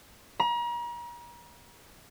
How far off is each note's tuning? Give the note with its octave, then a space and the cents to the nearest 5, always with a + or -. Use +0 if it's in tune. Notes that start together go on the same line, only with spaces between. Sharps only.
A#5 +40